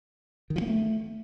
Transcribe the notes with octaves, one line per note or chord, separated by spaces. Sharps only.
D#3
F3
A#3
A3